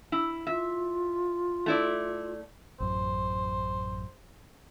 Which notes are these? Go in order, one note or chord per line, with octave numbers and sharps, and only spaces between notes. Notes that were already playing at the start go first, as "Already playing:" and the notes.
E4
F4 E5
A3 E4 D5
A1 F#2 C5